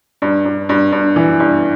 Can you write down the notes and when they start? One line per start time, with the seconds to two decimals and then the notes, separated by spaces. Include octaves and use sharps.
0.22 G2
0.45 G2
0.69 G2
0.92 G2
1.16 E3
1.40 G2